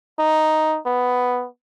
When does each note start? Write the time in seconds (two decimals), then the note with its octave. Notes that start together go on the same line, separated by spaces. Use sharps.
0.19 D#4
0.86 B3